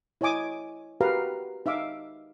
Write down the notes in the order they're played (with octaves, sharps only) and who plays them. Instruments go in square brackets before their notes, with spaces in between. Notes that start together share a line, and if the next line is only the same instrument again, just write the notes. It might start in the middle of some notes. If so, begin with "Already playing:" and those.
[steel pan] E4 C#5 D#5 G#5 D6 D#6
F#4 G4 A#4 B4 F5 A#5
D#4 E5 F5 D6